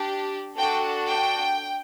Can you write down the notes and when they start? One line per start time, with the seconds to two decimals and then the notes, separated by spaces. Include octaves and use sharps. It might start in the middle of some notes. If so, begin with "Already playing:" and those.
Already playing: D4 G4
0.57 D4 F#4 A4 G5
1.09 G5